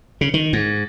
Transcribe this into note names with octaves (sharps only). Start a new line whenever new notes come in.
C#3
D#3
G#2